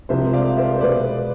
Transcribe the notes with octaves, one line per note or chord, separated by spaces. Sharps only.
C2 C3 F3 G#3 C5 E5
D5 F5
C5 E5
C5
B2 G#3 B3 B4 D5